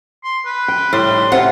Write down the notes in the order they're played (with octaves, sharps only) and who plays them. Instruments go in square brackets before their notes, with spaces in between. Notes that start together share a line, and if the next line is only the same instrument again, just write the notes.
[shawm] C6
B4
[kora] G5
[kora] A2 [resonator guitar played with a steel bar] G3 [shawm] C6
[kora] D#4
[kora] C3 [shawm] F4 [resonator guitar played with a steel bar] F#5